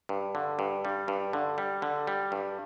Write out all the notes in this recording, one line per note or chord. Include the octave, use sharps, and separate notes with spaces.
G2
D3
G2
G3
G2
D3
G3
D3
G3
G2